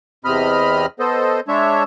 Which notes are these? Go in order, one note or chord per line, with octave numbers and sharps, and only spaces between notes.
E2 C3 C4 D#5 B5 F6
B3 A4 C5 D#5
G#3 D4 C#5 E5